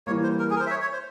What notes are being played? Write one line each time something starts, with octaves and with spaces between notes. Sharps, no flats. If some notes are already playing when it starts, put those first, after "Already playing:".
E3 G3 A#3 C#5
C5
A#4
G#4
A#4
C5
E5
C#5
C#5
C5